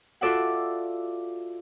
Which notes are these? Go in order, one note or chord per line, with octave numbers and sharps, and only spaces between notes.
F4 F#4 A4 D5 E5 F#5